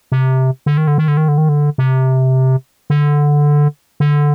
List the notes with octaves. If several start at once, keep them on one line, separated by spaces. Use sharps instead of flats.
C3
D3
D#3
D3
D#3
D3
D#3
D3
D#3
D3
C3
D3
D3